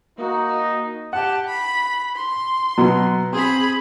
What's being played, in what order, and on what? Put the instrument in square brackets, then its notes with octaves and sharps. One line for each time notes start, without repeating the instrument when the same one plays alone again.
[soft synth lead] A#3 [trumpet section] D#4 [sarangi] F#4
[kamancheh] G4 A5 [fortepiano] F#5
[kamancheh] B5
C6
[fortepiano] B2 F#3
[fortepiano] C4 [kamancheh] G#4 B5